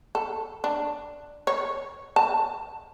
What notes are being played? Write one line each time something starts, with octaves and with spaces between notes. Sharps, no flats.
A4
D4
C#5
A5